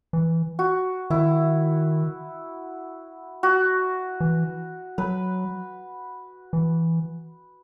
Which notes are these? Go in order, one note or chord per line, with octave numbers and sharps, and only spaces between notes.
E3
F#4
D#3 E4
F#4
E3
F#3 B4
E3